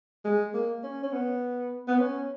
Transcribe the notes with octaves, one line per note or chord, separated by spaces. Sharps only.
G#3
A#3
C#4
C#4
B3
B3
C#4